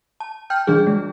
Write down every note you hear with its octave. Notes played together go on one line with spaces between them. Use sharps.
A5
G5 F6 G6
E3 G3 D4 G#4
G#3